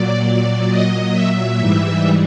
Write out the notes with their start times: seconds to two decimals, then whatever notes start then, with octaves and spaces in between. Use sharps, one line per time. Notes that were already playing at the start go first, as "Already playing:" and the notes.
Already playing: A#2 F#3 D5
0.69 D#5
1.14 E5
1.59 G#2 E3 G3